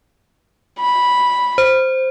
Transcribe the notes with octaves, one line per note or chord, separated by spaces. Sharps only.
B5
C5